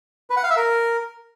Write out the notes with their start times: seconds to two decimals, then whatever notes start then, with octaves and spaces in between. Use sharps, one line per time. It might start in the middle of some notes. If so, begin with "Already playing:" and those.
0.30 B4
0.37 F#5
0.43 F5
0.50 E5
0.56 A#4